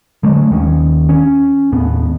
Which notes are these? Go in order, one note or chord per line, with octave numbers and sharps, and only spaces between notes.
D3 F#3 G#3 A3
D#2 D#3 G3 C#4
C#4
D#2 A2 B3